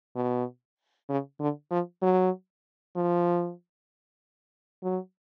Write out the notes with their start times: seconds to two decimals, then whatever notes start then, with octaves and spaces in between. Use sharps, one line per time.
0.16 B2
1.09 C#3
1.40 D3
1.71 F3
2.02 F#3
2.96 F3
4.83 F#3